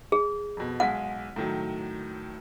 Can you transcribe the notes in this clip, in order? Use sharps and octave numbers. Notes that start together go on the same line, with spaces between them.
G#4
F2 B2
B1 G#3 F#5 B6
A2 D#3 F#3